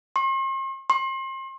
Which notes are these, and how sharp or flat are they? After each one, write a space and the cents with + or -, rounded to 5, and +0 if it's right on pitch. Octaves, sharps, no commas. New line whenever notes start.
C6 +45
C6 +35